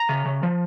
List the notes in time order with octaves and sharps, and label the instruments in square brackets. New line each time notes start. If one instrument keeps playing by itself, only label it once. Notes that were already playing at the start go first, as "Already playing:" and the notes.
Already playing: [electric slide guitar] A#5
C#3
C#3
F3